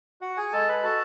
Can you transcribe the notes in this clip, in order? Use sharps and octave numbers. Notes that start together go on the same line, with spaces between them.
F#4 F#5
G#4 G#5
G#3 A4 A5
B4 B5
F#4 A4 A5